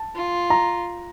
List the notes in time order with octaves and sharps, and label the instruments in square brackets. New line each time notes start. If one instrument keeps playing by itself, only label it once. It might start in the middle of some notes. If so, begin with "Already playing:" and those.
Already playing: [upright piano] A5
[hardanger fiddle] F4
[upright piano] A#5